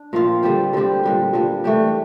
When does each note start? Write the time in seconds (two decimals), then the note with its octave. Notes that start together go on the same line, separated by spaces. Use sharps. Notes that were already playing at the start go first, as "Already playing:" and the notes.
Already playing: D4
0.13 A#2 F3 C4 F4
0.43 D3 G3 C4 G4
0.73 D3 G3 C4 G4
1.03 A#2 G3 D4
1.33 A#2 G3 D4
1.64 E3 A3 D4 G4